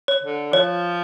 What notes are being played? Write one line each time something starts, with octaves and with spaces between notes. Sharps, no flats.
C#5
D3
F3 C#5